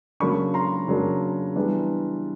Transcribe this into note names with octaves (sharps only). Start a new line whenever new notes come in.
C#3 F#3 A#3 D4 B5 C#6
A#5 C6
C#3 F#3 A#3 D4
E3 G3 B3 D4